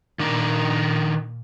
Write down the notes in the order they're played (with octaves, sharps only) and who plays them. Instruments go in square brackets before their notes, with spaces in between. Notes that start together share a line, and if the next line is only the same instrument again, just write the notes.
[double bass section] A#2 [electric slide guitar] D#3 D4 A#4